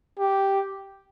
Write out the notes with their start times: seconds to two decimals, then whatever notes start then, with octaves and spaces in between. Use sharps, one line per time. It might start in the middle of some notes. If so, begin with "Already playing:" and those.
0.19 G4